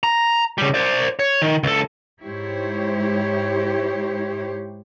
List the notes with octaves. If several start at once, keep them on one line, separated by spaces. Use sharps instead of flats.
A#5
C#3 G3
C5 D5
C#5
D#3
C#2 A4
G#2 E4 G4 C5 C#5